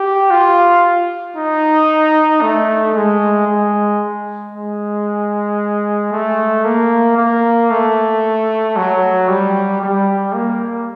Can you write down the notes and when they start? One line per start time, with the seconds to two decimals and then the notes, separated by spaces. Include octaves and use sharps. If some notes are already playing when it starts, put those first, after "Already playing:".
Already playing: G4
0.31 F4
1.36 D#4
2.42 A3
2.95 G#3
3.47 G#3
4.53 G#3
6.12 A3
6.65 A#3
7.17 A#3
7.71 A3
8.76 F#3
9.28 G3
9.82 G3
10.34 A#3